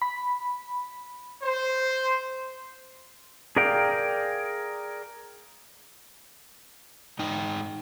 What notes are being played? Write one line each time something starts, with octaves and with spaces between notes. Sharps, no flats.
B5
C5
G#4 A#4 D5 F5 G5
G#2 D#4 G5